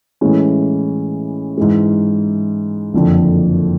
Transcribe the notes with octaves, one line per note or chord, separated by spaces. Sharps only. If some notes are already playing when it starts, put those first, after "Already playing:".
A2 E3 G#3 C#4
G#2 E3 G#3
F#1 F2 D3 F3